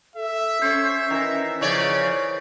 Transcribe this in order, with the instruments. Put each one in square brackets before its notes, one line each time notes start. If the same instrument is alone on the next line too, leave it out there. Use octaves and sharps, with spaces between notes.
[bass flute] A4 [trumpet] E5
[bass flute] C#4 [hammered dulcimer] C5 C#5
[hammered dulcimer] D#3 E3 A#5
[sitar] C#3 C#5 D5 [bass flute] F3